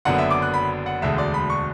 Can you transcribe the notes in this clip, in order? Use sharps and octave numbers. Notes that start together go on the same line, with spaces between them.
F#1 F#2 D3 F#3 B3 F#5
E5
D6
F#6
B5
F#5
E1 D2 D3 G#3 E5
D5
B5
C#6